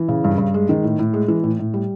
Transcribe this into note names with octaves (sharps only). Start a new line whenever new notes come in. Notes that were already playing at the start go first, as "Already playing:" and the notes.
Already playing: E3
C#3
G2
G2
G#3
D#3
A2
A2
G#3
E3
A2
A2
G3